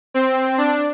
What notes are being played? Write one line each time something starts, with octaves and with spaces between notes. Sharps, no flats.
C4
D4